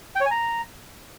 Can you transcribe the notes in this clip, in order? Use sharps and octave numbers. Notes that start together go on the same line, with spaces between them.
G5
C#5
G#5
A#5